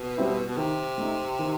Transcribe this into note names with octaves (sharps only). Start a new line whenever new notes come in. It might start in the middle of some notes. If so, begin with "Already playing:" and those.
Already playing: B2
G3 C4 E4
B2
C3 D#3
A3 D#4
D#3